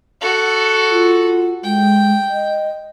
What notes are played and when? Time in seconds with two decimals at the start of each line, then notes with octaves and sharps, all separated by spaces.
0.21 F#4 A4
0.91 F4
1.64 G#3 G5
2.30 D#5